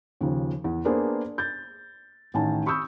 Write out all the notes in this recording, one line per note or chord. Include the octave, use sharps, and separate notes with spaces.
D#2 C#3 F3
E2
A#3 B3 D4 G#4 A#4 C5
G6 A6
A1 D#3 G#5 A5
B5 C#6 D#6 E6 G6